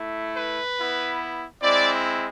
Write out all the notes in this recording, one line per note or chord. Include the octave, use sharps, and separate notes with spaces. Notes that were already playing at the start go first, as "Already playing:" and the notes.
Already playing: A3 E4
B4
B3 E4
G#3 C4 E4 D5